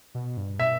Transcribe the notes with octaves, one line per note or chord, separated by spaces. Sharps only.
B2
G2
B2 E5